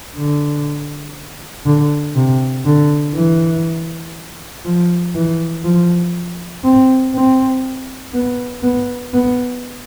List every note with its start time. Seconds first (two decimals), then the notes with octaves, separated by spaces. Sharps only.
0.16 D3
1.66 D3
2.15 C3
2.65 D3
3.15 E3
4.65 F3
5.15 E3
5.64 F3
6.64 C4
7.14 C4
8.14 B3
8.63 B3
9.13 B3